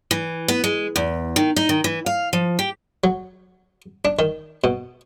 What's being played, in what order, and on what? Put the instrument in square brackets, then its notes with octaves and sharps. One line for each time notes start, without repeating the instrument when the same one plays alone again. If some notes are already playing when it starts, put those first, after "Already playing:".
[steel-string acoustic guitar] E3
B3
G#3
E2
D#3
D#4
D#3
E3
F5
F3
G4
[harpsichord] F#3
D4
D#3
B2